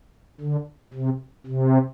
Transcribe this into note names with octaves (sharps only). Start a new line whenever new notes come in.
D3
C3
C3